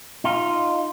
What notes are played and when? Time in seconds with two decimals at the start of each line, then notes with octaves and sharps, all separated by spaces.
0.24 D#4 F4